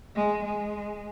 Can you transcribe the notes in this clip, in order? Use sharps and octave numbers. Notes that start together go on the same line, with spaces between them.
G#3
G#3